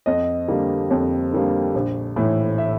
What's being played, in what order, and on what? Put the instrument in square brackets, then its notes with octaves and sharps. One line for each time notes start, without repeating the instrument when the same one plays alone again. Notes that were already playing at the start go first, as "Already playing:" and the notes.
[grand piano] F2 D#5
D3 G3 A#3
F2
D3 G3 A#3
A#1
A2 E3
E5